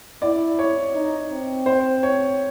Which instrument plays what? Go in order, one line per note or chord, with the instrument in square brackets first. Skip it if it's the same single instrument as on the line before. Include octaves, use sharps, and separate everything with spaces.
[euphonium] E4 [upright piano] D5
[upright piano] C#5
[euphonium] D#4
C4
[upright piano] C5
C#5